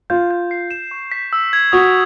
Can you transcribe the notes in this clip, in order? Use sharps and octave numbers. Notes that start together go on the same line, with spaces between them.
F4 G6
G6
C7
E7
C#6
B6
E6
G#6
F#4 D#6